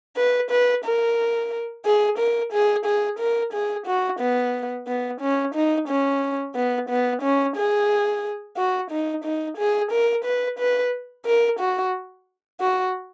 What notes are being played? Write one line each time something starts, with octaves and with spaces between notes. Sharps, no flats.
B4
B4
A#4
G#4
A#4
G#4
G#4
A#4
G#4
F#4
B3
B3
C#4
D#4
C#4
B3
B3
C#4
G#4
F#4
D#4
D#4
G#4
A#4
B4
B4
A#4
F#4
F#4